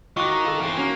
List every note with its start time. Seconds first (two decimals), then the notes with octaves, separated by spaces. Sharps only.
0.17 D#3 F4 F#4 C#6 D6 F#6
0.32 A#5
0.44 F4 A4
0.59 E2 C4
0.77 A#3 C#4 F#4